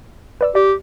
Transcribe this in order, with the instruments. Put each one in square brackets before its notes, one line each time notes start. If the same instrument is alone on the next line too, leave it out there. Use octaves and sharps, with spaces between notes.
[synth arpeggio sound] B4 D5 E6
[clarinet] G4 [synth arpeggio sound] D5